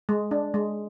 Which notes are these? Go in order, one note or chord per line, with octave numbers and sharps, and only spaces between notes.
G#3
D4
G#3